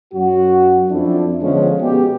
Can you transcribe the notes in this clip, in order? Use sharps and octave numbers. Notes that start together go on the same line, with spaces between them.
F#2 F#4
F2 D4 E4
D3 F3 G#3 B3 C#4 F4
B2 G#3 G4